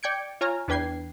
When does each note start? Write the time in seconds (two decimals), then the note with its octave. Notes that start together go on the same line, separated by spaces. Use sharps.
0.03 D5 G5 G6 G#6 C#7 D7
0.41 F4 C#5 G#5 A#5 F6
0.68 E2 D4 B4 G5 G#6 C7